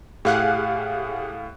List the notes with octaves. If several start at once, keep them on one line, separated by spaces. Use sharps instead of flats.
A2 G4 G#4 F5 F#5 F#6